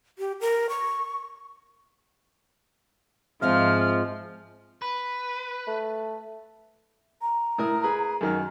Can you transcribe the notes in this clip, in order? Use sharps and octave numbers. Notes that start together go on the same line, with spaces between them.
G4
A#4
C#6
G#2 F3 G#3 C4 F4 E5 F6
B4
A3
A#5
A2 A#4 D#6
G#4 B4
F#2 D#3 F6